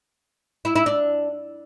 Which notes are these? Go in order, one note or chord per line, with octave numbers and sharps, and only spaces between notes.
E4
E4
D4